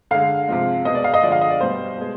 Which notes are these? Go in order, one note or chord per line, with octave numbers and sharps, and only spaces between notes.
D3 G#3 F5
C3 F3 G#3
B2 G#3 D#5
D5
F5
D#5
D3 F3 G#3 D5
F5
D#5
D5
B2 G3 C5
B2 G#3